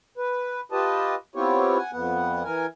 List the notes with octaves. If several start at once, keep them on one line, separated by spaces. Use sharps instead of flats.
B4
F4 G4 B4 D#5 A5
B3 C4 E4 F4 G4 C#5
F#5 G#5
F2 B3 F#5
E3 A#4 G#5